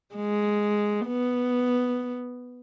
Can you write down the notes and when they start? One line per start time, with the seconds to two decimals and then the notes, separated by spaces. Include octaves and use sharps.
0.15 G#3
1.07 B3